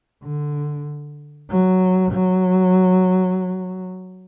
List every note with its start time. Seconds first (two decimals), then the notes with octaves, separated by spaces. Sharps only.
0.23 D3
1.49 F#3
2.12 F#3